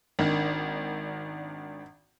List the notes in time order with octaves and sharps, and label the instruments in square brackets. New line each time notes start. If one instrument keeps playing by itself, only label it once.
[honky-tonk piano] G#1 D#3 D4